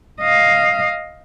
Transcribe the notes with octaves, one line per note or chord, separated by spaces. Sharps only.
D#5 F5